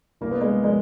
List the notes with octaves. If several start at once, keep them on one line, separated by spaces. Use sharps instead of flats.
C2 A#3
B3
G#3 A#3
F3 G#3 A#3